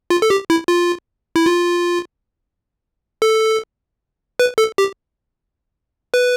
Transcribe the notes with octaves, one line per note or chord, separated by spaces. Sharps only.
F4
A4
G4
E4
F4
E4
F4
A4
B4
A4
G4
B4